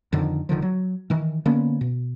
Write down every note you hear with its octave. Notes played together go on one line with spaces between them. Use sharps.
F2 D3 D#3
E1 D3 D#3 F3
F#3
D#3 E3
D3 A#3 B3 C#4
B2